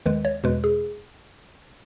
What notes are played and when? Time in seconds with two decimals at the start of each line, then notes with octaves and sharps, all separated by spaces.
0.06 D#2 D#3 G#3 B4
0.25 C#5
0.44 E2 B2 G#3 B4
0.64 G#4